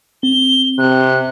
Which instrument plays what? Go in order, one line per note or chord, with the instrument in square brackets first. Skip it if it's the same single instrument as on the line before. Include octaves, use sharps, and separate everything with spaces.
[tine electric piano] C4 [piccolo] G7
[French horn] C3 [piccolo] F#6